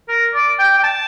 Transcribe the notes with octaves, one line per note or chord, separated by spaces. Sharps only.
A#4
D5
G5
G5
A5